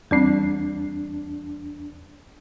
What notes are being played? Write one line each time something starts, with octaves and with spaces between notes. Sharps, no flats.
E2 G3 C4 D4